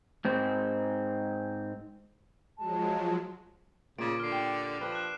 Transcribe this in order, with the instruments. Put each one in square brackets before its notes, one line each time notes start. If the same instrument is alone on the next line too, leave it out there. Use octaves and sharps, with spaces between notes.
[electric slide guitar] G#2 C4
[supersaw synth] F3 F#3 G#3 [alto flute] A5
[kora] A#2 C#5 D5 [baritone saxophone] C#3 [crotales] D6 D7
[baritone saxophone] D3 [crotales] F6 C7
[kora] G4
[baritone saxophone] F3 [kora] D4 B4 G5
[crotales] F#6 E7